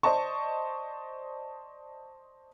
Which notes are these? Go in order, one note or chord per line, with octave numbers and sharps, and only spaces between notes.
C5 D5 D#5 A5 C#6